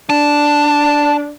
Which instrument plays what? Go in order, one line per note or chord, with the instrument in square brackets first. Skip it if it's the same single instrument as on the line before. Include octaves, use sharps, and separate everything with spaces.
[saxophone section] D4 [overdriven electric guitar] A5